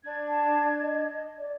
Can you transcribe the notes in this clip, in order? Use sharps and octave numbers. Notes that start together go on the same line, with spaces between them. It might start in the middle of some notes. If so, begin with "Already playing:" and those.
D4 G#6
A5
D#5
D5